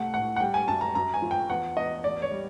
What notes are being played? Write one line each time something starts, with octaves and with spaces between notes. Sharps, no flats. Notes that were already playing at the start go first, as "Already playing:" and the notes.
Already playing: C2 A3 F#5
A2 F#5
F#5
G3 G5
G#5
F#2 A5
A#5
F#2 A#5
G#5
F3
G5
E2 F#5
E2 D#5
A1 D5
C#5
G3